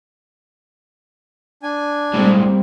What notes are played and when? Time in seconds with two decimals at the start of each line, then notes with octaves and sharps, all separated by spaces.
1.63 D4 G#5
2.14 A2 G3 G#3 A#3 C4